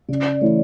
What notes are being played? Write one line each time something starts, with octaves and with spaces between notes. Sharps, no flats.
C#3 D5
D5
E3 A3 C#5